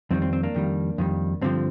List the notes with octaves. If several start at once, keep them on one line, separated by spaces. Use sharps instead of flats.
F2 D#3 G3 C4
C4
C4
A#3 D4
F2 D#3 G3
F2 D#3 G3
G2 D3 F3 C4